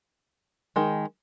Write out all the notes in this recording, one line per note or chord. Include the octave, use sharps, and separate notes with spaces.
D#3 G#3